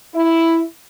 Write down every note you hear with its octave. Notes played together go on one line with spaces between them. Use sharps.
E4